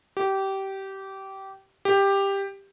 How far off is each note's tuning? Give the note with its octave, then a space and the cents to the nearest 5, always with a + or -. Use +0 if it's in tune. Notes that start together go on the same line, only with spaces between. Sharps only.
G4 -20
G4 +10